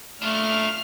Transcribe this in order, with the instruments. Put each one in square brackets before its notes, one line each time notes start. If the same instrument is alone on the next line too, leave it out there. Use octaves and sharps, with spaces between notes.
[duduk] A3 [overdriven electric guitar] D4 F4 [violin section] F6